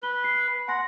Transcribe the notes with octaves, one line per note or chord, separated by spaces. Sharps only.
B4 G7
C7
F#5 G#5 C6 A#6